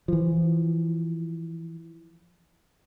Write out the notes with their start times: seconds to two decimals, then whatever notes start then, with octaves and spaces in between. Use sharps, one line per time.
0.08 E3 F3